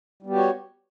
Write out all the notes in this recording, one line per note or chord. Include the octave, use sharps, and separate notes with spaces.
G3 B3 F#4 G4 C#5